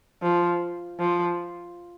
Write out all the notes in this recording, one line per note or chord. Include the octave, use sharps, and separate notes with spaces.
F3
F3